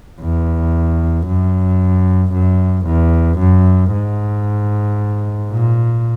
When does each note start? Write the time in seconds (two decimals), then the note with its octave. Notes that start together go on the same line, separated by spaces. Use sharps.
0.21 E2
1.27 F#2
2.33 F#2
2.86 E2
3.39 F#2
3.92 G#2
5.51 A#2